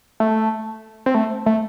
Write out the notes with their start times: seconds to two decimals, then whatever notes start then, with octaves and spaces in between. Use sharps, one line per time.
0.20 A3
1.06 C4
1.15 A3
1.46 A3